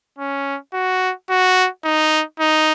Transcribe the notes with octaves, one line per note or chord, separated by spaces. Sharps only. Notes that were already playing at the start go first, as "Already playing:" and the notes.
C#4
F#4
F#4
D#4
D#4